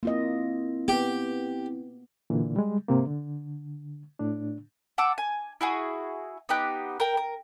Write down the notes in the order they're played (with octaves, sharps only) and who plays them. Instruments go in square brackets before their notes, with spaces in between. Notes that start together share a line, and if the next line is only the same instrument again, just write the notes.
[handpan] A#3 F4 D#5 [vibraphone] C4 E4
[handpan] B3 [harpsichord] G4
[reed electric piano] A#2 D3 E3
G3 G#3
G#2 C3 A#3
D3
A2 D4
[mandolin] F#5 A5 D6 E6
G#5
E4 F#4 G#4
B3 D#4 G4 F#6
A#4 G5
A#4